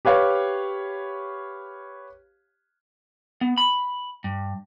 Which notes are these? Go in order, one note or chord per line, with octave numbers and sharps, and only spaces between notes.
G4 B4 C#5 F5
B3
B5
G2